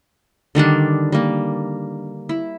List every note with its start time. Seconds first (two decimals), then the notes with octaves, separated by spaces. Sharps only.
0.55 D3 D#3 G3 D4
1.12 G3 A#3
2.29 E4